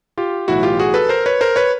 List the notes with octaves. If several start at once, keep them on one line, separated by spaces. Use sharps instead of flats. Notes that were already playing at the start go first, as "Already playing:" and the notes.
F4 G4
B1 A2 E3 E4 F#4
F4 G4
F#4 G#4
A4 B4
A#4 C5
B4 C#5
A#4 C5
B4 C#5